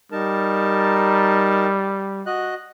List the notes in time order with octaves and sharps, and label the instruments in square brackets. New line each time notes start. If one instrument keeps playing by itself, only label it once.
[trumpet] G3 [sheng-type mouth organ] D#4 A#4 A5
[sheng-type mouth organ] F#4 D#5 F#6